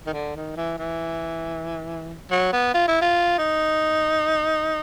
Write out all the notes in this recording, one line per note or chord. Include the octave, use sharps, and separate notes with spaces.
D#3
D3
D#3
E3
E3
F#3
B3
F4
E4
F4
D#4